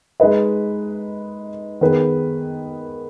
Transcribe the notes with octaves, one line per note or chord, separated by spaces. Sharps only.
G#3 D#4 B4 D#5
D#3 B3 G#4 B4